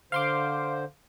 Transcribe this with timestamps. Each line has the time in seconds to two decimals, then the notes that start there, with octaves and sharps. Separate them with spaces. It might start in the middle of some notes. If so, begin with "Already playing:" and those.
0.12 D3 C5 F5 C6 D6